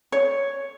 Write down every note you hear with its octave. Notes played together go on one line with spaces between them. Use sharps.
C#5